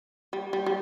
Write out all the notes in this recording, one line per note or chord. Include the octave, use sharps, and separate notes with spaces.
G3
G3
G3